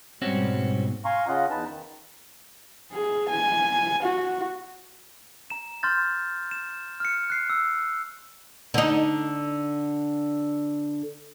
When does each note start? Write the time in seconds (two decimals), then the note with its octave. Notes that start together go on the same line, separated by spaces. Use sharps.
0.22 G#2 B2 G3 C4 C#4 F#4
1.05 F5 G#5 A#5 C6 C#6
1.28 C#3 C#4 F4 D#5 F#5
1.51 E2 D#4 B4 A5
1.67 D#3
2.93 G#4
3.29 G#5
4.03 F#4
5.50 A#5 E7
5.83 C6 F6 G6 A6
6.51 E7
7.00 F6 C#7
7.30 F#6 C7
7.50 E6
8.74 D3 D#4